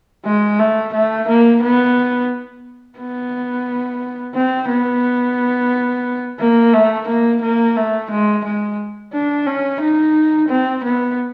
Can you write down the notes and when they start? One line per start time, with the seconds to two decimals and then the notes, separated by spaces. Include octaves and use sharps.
0.25 G#3
0.59 A3
0.93 A3
1.28 A#3
1.62 B3
2.99 B3
4.35 C4
4.69 B3
6.40 A#3
6.73 A3
7.08 A#3
7.42 A#3
7.76 A3
8.10 G#3
8.45 G#3
9.13 D4
9.46 C#4
9.81 D#4
10.49 C4
10.84 B3